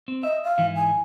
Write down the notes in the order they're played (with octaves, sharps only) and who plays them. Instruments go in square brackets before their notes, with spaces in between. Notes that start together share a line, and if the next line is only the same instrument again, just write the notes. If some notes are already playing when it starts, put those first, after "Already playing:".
[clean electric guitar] C4
[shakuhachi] D#5 [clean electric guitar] E5
[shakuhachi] F5
[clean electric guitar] G#2 E3 E4
[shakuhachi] G#5